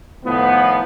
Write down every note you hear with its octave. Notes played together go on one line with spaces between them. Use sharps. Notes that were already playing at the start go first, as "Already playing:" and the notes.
A2 D#3 F3 B3